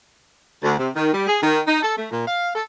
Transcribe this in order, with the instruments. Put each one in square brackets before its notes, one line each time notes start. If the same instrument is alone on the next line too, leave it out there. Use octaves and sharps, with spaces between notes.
[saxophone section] D2
C3
D#3
G3
G#4
D#3
D#4
A4
A3
A#2
F5
A4